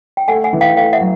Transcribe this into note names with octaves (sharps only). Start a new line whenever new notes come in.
G5
A3 F#5 G#5
F#5 G#5
E3
F5 G5
A3 F5 G5
E5 F#5
F#3